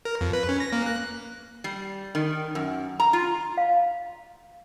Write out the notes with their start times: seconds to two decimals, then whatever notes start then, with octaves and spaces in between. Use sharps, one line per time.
0.05 A#4
0.21 F2
0.33 B4
0.49 C#4
0.60 A#6
0.73 A#3
0.86 F#6
1.64 G3
2.15 D#3
2.55 F#2
3.00 A#5
3.13 F4
3.57 F5